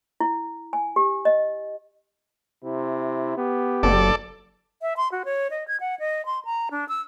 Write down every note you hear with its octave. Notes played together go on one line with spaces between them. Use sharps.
E4
G#5
G4
D#5
C3 E4
B3 G4
F#1 A4 D5
E5
C6
F#4
C#5
D#5
G#6
F#5
D#5
C6
A#5
D4
E6